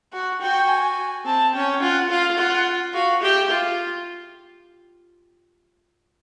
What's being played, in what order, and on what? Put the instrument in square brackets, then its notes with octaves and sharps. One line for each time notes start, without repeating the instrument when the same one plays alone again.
[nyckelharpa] F#4 [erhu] F#5
[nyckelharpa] F#4 [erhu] G5
[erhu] G#5
[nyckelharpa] C4 [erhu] A5
[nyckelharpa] C#4 [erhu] G5
[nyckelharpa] F4 [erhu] F#5
[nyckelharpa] F4 [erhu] F5
[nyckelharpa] F4 [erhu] F#5
[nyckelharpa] F#4 [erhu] F5
[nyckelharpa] G4 [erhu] E5
[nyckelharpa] F4 [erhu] F5